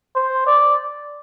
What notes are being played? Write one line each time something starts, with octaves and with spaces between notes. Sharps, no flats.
C5
D5